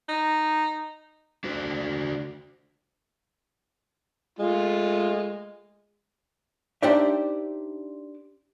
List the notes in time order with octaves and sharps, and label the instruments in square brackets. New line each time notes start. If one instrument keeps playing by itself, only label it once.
[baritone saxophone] D#4
[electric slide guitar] D4 F#4 C5
[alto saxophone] G#3 [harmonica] A3 F4
[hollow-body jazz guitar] D4 D#4 G4 C5 D5 E5